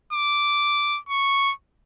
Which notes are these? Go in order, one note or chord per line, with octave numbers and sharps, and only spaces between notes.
D6
C#6